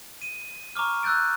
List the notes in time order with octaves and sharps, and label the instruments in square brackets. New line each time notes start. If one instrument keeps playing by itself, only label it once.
[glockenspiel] D#7
A#5 C#6 D6 F6
E6 F#6 G6 A6 D7